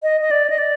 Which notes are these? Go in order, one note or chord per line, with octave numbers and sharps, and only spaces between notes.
D#5
D#5
D5
D#5
D5